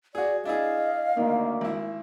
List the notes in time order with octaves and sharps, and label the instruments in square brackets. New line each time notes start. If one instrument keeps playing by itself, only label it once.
[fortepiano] F#4 G#4 [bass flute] D5
[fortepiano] D4 E4 G#4 [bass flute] D#5 [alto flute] F5
[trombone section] D2 A#3 [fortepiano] D#3
[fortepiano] G#1 E4